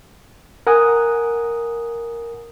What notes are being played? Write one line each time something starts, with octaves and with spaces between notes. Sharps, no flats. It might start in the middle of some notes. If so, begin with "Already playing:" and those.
A#4 F#5 G#5 D#6